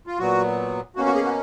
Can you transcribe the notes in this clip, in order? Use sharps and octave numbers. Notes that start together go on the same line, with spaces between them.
F4
A#2 F#3 B3 F#4
B2 A#3 C#4 F#4
F#4
G#4
F#4